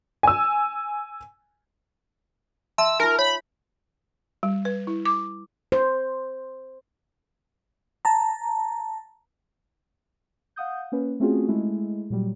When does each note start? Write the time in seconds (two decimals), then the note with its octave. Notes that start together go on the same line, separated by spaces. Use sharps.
0.23 G#5 E6
2.78 E5 A5 C6 E6
3.00 D#4 F4 A#4
3.19 C#5 B5
4.43 G3
4.65 B4
4.87 E4
5.05 D6
5.72 C5
8.05 A5 A#5
10.56 F5 F#5 D#6 G6
10.92 A#3 C#4 B4
11.20 A3 C4 C#4 F4 F#4 G#4
11.48 G#3 A3 E4
12.10 A#2 F#3 G3